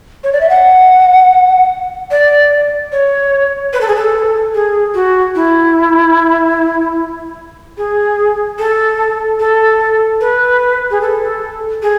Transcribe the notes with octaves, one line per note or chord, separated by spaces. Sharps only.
C#5
D5
E5
F#5
D5
C#5
B4
A4
G#4
A4
G#4
F#4
E4
G#4
A4
A4
B4
G#4
A4
G#4